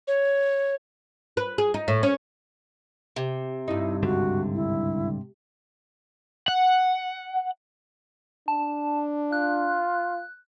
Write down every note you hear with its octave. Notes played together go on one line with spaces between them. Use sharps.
C#5
B4
G#4
D#4
A2
C#4
C3
G2 D#4 E4
C#2 G#2 D3 F#4
E4
F#5
D4 A5
F4 F#6